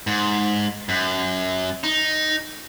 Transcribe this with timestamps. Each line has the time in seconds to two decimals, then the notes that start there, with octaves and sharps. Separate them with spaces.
0.07 G#2
0.89 F#2
1.84 D#4